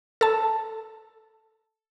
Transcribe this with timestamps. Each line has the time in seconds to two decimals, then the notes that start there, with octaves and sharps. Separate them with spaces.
0.21 A4 A5